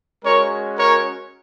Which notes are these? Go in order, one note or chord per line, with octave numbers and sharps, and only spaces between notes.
G#3 C#4 F#4 A#4 C#5
A#4 C#5